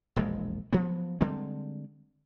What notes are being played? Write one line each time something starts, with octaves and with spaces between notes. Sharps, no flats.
E1 A#1 F2 G#3
F3 F#3 B3
D3 G3 G#3 C4